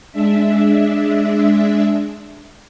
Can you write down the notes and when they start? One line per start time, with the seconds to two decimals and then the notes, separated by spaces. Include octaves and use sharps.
0.12 G#3 D4 E5